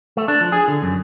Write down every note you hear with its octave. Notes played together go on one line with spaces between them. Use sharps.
A3
D4
F3
G#4
D3
F#2